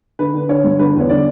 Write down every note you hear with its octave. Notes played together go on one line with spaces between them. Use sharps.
D3 B4
D3
D3 C#5
G2
D3 B4
E2
C#5
D3 D5